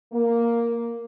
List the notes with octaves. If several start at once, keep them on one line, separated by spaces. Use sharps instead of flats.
A#3